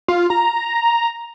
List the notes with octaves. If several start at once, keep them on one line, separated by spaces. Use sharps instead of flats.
F4
A#5